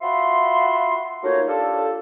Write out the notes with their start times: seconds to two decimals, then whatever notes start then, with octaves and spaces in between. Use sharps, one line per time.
0.02 F4 F#4 E5 B5 C6
1.23 A3 A#3 D#4 F4 F#4 C#5
1.47 D4 F4 G4 A4